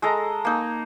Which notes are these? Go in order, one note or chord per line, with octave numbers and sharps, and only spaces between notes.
G#3 A4 D#5 A#5
A#3 D#4